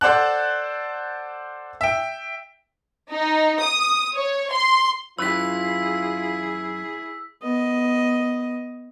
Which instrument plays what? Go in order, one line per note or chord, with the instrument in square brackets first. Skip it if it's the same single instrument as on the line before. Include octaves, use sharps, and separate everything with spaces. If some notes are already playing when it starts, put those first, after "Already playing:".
[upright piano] A4 C5 D5 F#5 A5 F#6
E5 G5
[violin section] D#4
D#6
C#5
C6
[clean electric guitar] F#2 B4 [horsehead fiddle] E4 G#4 [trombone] F4 [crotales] E6 B6
[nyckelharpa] B3 D#5